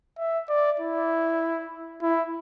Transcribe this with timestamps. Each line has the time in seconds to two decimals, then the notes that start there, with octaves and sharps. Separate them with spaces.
0.18 E5
0.49 D5
0.80 E4
2.02 E4